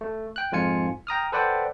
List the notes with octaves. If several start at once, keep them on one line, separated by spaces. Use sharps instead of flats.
A3
G5 F#6
F2 G#2 F4 G#5 C#7
G5 A#5 D#6 F6
A4 B4 C5 D5 F#5 G5